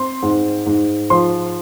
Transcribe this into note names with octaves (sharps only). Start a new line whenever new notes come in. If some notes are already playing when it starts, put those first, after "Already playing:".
Already playing: C4 C6
G#2
G#2
F3 C6